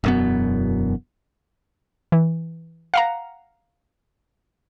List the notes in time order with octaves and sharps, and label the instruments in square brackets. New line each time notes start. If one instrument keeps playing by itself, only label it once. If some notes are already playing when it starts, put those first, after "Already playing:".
[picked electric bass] E1 F#2 B3
[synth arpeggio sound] E3
F5 F#5 A#5